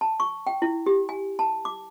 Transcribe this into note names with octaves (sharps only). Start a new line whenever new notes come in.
A5
C#6
G5
E4
G4
G#5
A5
D6